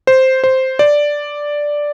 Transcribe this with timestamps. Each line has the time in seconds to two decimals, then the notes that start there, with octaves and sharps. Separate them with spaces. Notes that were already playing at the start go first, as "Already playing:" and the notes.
0.07 C5
0.44 C5
0.79 D5